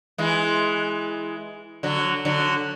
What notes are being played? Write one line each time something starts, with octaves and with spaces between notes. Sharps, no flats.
E3 G#3
D3 F#3
D3 F#3